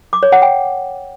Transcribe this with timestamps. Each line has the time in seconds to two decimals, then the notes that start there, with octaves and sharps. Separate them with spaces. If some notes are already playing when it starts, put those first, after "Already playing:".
0.13 D6
0.23 C#5
0.32 F#5
0.42 G5